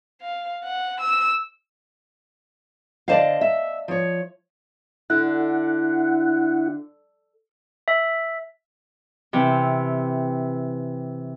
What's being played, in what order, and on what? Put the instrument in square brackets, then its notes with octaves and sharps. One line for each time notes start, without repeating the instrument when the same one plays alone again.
[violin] F5
F#5
E6
[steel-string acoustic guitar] D3 C5 A5 [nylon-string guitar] D5 D#5 F5
[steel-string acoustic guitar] E5
F3 C#5
[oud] D3 [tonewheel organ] E4 F#5
[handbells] E5
[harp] C3 E3